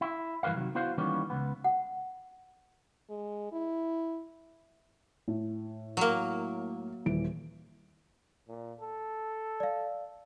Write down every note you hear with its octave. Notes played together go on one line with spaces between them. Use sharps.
E4
G2 E3 A#4 B4 F5
C3 D#3 F#3
B3 E4 F#4 C5 F5
D#3 E3 G3 A#3 B3 C#4
C#2 B3
F#5
G#3
E4
A2
F#3 A#3
D#1 E3 D7
A#2
A4
D5 F5